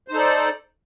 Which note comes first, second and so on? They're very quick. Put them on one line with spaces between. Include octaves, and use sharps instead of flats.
C5 D#4 A4 D5